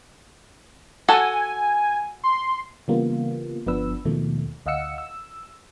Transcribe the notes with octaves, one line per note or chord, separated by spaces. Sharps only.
F#4 A4 F#5 G#5
C6
C#3 E3 G3 A#3 B3 F4
G1 F3 B3 D4 B4 E6
D#2 B2 D#3 F3 A3
D2 D#5 F5 F#5 E6 C#7
E6